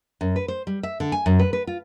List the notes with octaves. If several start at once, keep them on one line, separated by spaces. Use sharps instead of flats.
F#2
B4
C5
G3
E5
D3
G#5
F#2
B4
B4
F4